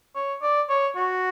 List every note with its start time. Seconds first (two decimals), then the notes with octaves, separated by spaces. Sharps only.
0.15 C#5
0.42 D5
0.69 C#5
0.96 F#4